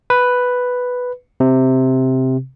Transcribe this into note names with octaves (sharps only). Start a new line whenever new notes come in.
B4
C3